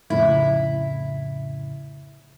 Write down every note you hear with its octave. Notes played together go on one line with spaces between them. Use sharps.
F2 A2 C#3 E4